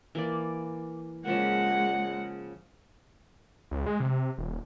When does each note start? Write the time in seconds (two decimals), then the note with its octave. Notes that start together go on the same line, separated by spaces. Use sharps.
0.15 E3 A#3 D5
1.25 C#3 F3 G#3 A#3 F#5
3.71 C#2
3.86 G#3
4.00 C3
4.38 D#1